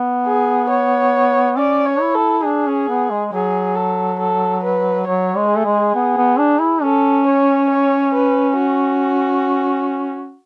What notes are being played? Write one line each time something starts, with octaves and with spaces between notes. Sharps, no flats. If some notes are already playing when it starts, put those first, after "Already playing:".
Already playing: B3
G#4
C#5
C#4 D5
C#5
E4
A4
D4 G#4
C#4
B3
G#3
F#3 G#4
A4
A4
B4
F#3 C#5
G#3
G#4
A3
G#3
B3
B3
D4
E4
C#4 A4
C#5
C#5
B4
F#4